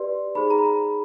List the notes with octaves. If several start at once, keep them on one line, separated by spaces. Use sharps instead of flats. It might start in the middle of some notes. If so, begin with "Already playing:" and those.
Already playing: G4 B4 D5 C6
D#4 G#4 C5 B5
A#5
B5
A#5